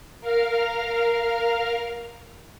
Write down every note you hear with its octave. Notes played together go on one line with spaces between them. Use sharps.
A#4 F5 F6